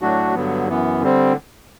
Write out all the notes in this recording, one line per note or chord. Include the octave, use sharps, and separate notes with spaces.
A2 F#3 A3 D4 F#4
G2 D3 F#3 B3
F#2 E3 B3
D3 G3 C4